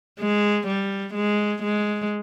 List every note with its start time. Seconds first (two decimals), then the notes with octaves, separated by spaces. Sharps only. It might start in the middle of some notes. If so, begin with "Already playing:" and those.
0.19 G#3
0.67 G3
1.14 G#3
1.63 G#3